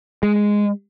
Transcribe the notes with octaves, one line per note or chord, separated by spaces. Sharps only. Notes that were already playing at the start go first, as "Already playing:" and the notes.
G#3